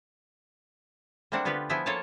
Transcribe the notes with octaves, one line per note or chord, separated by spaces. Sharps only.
G3 A3 A#3 C4 D4 F#5
D3 B3 F4 G4 B4 D5
F3 B3 E4 E5 G5 G#5
A#3 F4 A4 C#5 G#5 A5